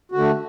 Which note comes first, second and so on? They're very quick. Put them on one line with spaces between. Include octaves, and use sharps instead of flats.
F#4 D3 A3